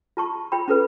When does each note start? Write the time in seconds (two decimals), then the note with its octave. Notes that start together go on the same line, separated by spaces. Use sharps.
0.17 F4 A5 C#6
0.52 F4 G5 B5
0.68 C#4 F4 A4 B4